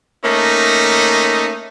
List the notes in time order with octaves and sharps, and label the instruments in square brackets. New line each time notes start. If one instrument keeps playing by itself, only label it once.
[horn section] A3 A#3 C#4 D#4